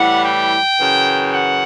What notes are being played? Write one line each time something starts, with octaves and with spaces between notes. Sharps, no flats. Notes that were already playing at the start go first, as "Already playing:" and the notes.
Already playing: A2 E3 G3 F#5
G5
F#2 C#3 E3
F#5